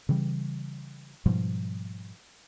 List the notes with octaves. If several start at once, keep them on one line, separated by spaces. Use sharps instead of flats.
C#3 E3 G3
G#2 B2 F3 G3